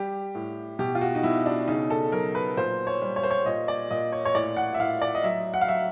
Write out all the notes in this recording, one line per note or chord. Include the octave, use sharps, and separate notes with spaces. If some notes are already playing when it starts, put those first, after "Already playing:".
Already playing: G3 G4
A2
B2 G4
F4
F#4
D#4
B2 E4
D4
C#3 D#4
A4
F#3 A#4
B4
A#2 C5
C#5
G3
C#5
C5
C#5
A#2 D#5
D5
A#2 D#5
C#5
C#5
A2 D5
F#5
E5
A2 F5
D5
D#5
F#3 E5
F#5
F5
F#3 E5